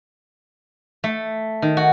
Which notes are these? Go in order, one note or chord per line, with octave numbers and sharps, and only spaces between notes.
A3
D#3
F#4